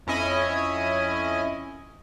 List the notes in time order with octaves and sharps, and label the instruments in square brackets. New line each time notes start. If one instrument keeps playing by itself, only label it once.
[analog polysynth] F2 C#4 E4 D#5 G#5